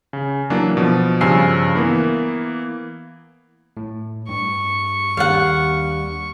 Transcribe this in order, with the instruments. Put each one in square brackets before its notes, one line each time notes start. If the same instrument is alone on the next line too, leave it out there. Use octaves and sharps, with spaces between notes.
[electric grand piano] C#3
E3 F#3 A#3 D4
B2 F3
G2 C#3 F3 G#5 E6 C7
E3 A#3 B3
[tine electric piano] A2
[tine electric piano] G2 [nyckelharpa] C#6
[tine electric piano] D#2 G3 D4 [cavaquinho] F5 F#5